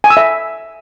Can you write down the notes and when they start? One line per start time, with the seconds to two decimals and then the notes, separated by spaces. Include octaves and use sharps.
0.04 G#5
0.10 E6
0.17 E5